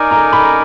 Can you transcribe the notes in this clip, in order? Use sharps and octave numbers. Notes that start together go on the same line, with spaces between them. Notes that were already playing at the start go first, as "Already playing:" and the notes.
Already playing: D#4 A#4 D5 G#5
A#5
B5